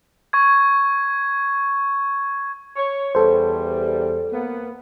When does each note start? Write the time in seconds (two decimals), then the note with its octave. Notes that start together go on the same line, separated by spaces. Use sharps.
0.33 C#6 G#6
2.77 C#5
3.15 E2 G3 A4 C5
4.33 A#3 B3